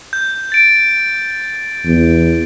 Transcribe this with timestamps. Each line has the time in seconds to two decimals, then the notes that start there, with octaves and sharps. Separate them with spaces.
0.13 G6
0.52 A6 D7
1.86 E2